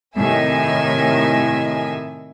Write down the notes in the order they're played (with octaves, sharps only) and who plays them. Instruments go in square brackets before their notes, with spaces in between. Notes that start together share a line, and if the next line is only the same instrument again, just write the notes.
[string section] A2 C3 D#3 E5 G#5